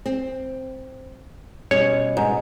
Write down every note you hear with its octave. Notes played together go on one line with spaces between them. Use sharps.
C4
B2 G3 C#4 C#5
G#2